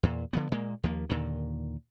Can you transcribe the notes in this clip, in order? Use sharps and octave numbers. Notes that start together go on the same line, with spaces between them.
E2 A#2
D3 F3 B3
A#2 G#3 A#3
D#2 F3 A#3
D#2 A#2 D3 D#3